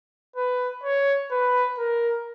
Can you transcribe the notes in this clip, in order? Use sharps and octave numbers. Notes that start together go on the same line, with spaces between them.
B4
C#5
B4
A#4